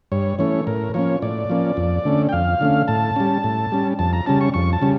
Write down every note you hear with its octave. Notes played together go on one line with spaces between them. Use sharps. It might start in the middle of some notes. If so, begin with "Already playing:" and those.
G2 C#5
E3 A3 C#4 C#5
A2 A#4
F3 A#3 C#4 C#5
A2 D5
F3 A#3 C#4
F2
D3 A3 C#4
G5
F2 F5
D3 A3 C#4
A2 A5
G3 C#4
A2
G3 C#4
F2 A5
A#5
C#3 G3 C#4 A5
C#6
F2 C#6
A5
C#3 G3 C#4